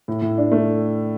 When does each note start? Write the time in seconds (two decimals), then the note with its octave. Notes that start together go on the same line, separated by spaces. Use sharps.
0.08 A2
0.22 A2
0.38 D4
0.52 A3